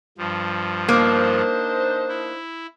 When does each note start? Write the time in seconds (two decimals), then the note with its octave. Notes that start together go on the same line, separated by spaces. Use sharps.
0.18 G2 F3
0.89 A#3 D4 D#4 C5
2.09 E4